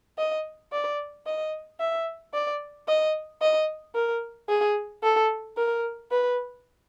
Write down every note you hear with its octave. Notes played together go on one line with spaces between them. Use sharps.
D#5
D5
D#5
E5
D5
D#5
D#5
A#4
G#4
A4
A#4
B4